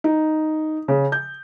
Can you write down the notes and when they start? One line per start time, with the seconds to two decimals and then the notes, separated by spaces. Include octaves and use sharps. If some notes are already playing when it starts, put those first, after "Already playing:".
0.04 D#4
0.88 C#3
1.12 G6